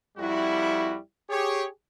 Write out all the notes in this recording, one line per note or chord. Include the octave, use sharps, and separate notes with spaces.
F2 G3 E4 F#4
G4 G#4 C#5